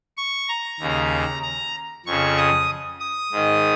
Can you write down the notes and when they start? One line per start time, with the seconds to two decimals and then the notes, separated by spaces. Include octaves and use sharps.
0.17 C#6
0.48 A#5
0.80 D#2 C#3
1.42 A#5
2.06 F2 C#3 C#6
2.37 D#6
3.00 D#6
3.32 G#2 D#3